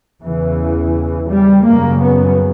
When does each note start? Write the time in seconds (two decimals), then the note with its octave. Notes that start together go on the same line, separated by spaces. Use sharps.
0.23 E2 C#3 E3
1.30 G3
1.65 F#2 C#3 A#3
2.01 B3